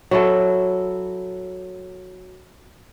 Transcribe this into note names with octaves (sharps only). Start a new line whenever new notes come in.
F#3 E4 A4